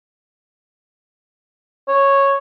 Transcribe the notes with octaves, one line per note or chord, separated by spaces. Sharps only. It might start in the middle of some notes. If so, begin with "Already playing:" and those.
C#5